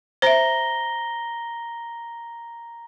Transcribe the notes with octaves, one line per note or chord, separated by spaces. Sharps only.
C5 E5 A#5 A#6 G7